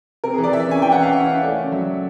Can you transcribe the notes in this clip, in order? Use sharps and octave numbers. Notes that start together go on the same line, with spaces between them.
C3 A#4
G#4
E3
D5
E3 E5
C#4 G#5
E3 G5
F#5
C#4 F5
C#4 E5
C#4
A3 D5
C#3
F#3 E5